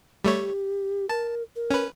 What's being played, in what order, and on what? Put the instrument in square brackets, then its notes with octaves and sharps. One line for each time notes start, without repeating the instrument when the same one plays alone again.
[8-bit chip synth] G3 A3 C#5 [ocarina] G4
[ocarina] A#4 [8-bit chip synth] A5
[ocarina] A#4
[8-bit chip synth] C#4 B4